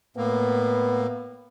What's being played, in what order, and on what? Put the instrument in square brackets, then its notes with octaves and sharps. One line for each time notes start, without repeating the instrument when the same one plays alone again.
[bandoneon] A2 A#3 [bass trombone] B3